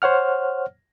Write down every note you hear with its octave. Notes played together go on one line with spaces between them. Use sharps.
C5 C#5 F#5 F6